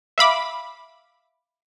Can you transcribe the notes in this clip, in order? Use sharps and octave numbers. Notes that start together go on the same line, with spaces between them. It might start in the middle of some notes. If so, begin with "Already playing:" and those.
E5 F5 B5 D6